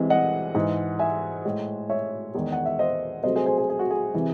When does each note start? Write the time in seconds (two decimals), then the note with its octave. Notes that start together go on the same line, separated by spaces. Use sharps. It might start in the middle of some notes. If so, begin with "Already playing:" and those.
Already playing: C2 C3 E3 G#3
0.10 D#5 F#5
0.55 G#2 E3 G#3
0.99 E5 G#5
1.45 A2 G#3
1.90 C#5 E5
2.34 E2 D#3 G#3
2.52 F#5
2.65 E5
2.79 C5 D#5
3.23 C2 C3 F#3 A3 C5 D#5
3.36 G#4 C5
3.46 G#4 C5
3.58 G#4
3.70 G#4
3.79 F#4
3.91 G#4
4.14 C3 E3